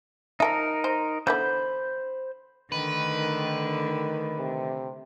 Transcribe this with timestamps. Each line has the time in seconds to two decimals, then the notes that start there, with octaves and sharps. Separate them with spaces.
0.40 F3 D#4 A4 A#4 E5
0.84 C5
1.27 D3 E3 B3 C5 B5 G6
2.72 D3 D#3 A3 B4
4.38 C3